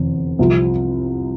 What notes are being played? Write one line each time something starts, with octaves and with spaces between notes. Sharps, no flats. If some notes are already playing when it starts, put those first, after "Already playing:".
Already playing: F1 E2 D3
C2 C3 F3